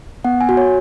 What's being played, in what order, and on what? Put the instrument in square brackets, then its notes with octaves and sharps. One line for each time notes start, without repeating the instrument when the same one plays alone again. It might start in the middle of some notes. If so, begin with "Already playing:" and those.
[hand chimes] B3 F#5
G#5
F#4
C#5